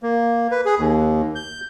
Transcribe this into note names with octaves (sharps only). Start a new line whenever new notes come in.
A#3
B4
G#4
D#2
G6